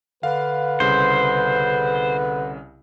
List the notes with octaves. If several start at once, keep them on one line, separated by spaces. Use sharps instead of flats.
D3 B4 F5
C2 C#3 C5